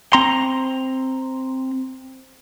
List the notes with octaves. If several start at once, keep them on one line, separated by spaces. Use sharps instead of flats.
C4 A#5 C6